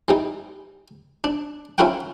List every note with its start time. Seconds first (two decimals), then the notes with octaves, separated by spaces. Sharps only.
0.08 E3 G3 D#4
1.24 D4
1.78 C#4 E4 F4 A#4 F#5 G5